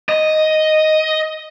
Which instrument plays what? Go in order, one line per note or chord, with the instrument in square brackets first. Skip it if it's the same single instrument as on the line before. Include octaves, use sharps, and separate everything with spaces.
[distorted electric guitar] D#5